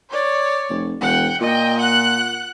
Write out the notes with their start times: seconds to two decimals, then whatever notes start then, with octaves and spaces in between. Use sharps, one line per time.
0.10 C#5 D5
0.70 F1
1.01 E1 F#5 G5
1.41 A#2 D#5 G5
1.80 F#5 F#6